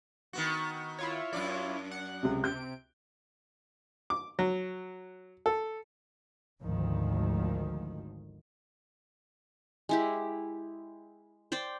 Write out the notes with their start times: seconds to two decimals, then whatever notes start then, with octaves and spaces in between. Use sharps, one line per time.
0.33 D#3 B3 F#4
0.98 E4 F4 C#5
1.33 F#2 D4 D5
1.91 F#5
2.23 C#2 C3
2.44 C3 G6 D7
4.10 D6
4.39 F#3
5.46 A4
6.62 G#1 D2 D#3 F3
9.89 G#3 E4 G4
11.52 C5 D5 G5